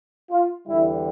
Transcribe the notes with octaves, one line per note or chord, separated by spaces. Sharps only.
F4
E2 D3 G3 E4